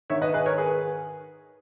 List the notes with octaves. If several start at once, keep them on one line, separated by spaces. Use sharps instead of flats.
G#2 D#3 C#5 E5
B4 D#5
G#4 B4
A#4 C#5
G#4 B4